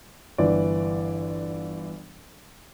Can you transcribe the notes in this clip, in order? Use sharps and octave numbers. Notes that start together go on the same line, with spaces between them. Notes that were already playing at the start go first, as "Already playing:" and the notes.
G1 E3 D5